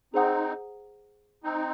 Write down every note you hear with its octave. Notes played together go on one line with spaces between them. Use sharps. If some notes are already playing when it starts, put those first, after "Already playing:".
C4 D#4 G#4 C5 F#5 A#5 D#6
C4 D#4